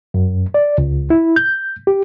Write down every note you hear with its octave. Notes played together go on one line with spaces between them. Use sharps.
F#2
D5
C#2
E4
G6
G4